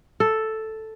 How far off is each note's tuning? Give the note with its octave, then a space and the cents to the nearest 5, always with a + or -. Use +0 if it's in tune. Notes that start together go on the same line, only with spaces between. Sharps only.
A4 +0